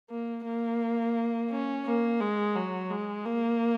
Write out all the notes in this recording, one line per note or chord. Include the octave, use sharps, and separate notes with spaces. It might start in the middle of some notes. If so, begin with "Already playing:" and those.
A#3
A#3
C#4
A#3
G#3
F#3
G#3
A#3